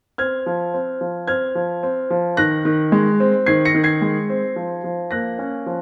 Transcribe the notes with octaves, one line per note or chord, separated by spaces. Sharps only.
C4 F6 G#6
F3
C4
F3
C4 F6 G#6
F3
C4
F3
D#3 F#6 A#6
D#3
G#3
C4
D#3 G#6 C7
A#6 C#7
D#3
G#6 C7
G#3
C4
F3
F3
A#3 F#6 A#6
C#4
F3